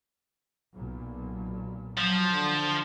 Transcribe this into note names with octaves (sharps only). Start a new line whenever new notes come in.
B1 A#2
F3 F#3
D3